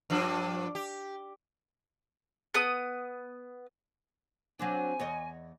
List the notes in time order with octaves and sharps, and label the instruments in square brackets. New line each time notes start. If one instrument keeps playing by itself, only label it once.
[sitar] G2 F3 D4
G4
[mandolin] B3 D#6
[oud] F#3 C4 D4 [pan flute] G#5
[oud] E2 C#5 D#5